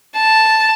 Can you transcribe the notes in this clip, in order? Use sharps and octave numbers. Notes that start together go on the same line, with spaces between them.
A5